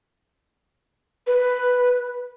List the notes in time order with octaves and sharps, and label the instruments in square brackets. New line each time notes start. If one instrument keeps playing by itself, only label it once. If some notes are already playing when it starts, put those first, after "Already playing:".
[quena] B4